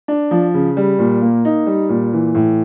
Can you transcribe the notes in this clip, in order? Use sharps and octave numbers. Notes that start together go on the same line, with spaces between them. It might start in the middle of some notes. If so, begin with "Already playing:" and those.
D4
F3
C#3
G3
A#2
A#3
D#4
G3
A#2
E3
A2